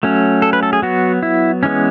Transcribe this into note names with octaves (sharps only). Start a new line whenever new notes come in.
F#3 A3 C#4
A4
B4
A4
G#4
F#3 B3 F#4
E4
E3 G#3 B3 C#4